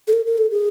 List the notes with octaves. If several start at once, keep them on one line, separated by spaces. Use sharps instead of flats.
A4
A#4
A#4
A4
G#4